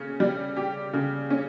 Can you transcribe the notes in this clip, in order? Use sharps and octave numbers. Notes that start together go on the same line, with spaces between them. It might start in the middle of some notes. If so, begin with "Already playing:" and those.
Already playing: C#3 C#4
G3
G4
C#3
C#4